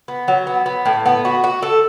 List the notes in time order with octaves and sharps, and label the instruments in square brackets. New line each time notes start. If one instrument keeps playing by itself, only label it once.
[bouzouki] B3
F#3
B3
B3
A2
B3
F#4
F#4
A4